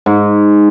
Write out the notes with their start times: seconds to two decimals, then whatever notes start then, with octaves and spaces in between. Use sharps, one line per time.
0.06 G#2